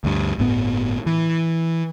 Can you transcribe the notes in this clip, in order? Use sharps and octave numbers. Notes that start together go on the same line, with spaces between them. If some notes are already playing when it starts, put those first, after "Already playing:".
D2 G2
G1 A2 B3
E3